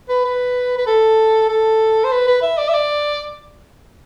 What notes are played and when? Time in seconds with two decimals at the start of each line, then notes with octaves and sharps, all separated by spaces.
0.09 B4
0.25 B4
0.78 B4
0.87 A4
1.49 A4
2.04 C5
2.12 B4
2.27 B4
2.42 E5
2.58 D5
2.69 E5
2.74 D5